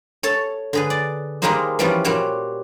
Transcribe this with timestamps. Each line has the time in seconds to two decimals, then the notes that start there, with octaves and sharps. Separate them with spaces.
0.23 A4 C#5 A5
0.73 D3 G#4 B4
0.90 D5
1.42 D#3 G3 G#3 A#3 D#4 C5
1.79 E3 F3 G3 B3 C#4 F4
2.04 A#2 G3 F#4 C5 C#5